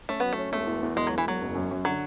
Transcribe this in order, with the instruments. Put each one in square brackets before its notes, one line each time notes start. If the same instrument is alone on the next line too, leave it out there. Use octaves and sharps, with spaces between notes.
[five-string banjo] A3 [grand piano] C#4
[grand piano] F#3 [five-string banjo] B3
[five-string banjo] A3
[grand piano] C#4
[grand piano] E1 [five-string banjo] A3
[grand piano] E2
E2
[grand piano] E1 [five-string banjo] G#3
[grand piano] E1 [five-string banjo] F#3
[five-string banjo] E3
[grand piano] E1 [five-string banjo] F#3
[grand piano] F#1
F#2
F#2
[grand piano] D3 [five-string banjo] F#3